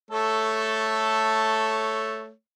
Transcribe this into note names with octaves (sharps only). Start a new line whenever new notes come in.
A3 A4 C#5